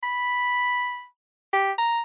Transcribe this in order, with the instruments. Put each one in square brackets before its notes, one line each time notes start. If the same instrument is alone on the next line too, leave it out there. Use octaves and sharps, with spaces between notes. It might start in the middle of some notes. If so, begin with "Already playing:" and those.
[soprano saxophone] B5
G4
A#5